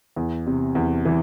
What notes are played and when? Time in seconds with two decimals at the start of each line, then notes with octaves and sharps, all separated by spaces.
0.16 E2
0.47 C3
0.75 E2
1.05 E3